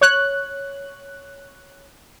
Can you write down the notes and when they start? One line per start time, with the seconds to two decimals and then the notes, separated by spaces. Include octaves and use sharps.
0.01 C#5 F#6